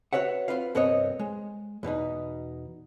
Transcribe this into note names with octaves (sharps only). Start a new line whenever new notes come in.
F#4 B4 C#5 E5 F#5
C4 F4 B4 F5
C2 G2 B3 C4 C#5 D#5
G#3
E2 B2 B3 D#4